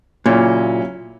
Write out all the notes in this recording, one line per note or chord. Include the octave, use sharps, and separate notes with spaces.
A#2 C#3 F#3 C#4 E4